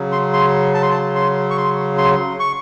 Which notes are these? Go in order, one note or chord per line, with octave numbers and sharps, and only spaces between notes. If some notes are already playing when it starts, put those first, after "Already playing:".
Already playing: C#3 F#3
C6
C6
A5
C6
A5
C6
C#6
C6
C6
C#6